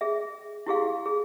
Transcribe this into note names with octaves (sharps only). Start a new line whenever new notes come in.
G#4 E5
E4 G4 G#4 F5
G#4